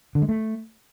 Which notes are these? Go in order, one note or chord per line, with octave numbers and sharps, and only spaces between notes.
D3
G#3
A3